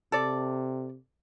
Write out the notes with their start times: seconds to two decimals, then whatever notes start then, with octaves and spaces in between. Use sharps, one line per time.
0.12 C3 A4 D5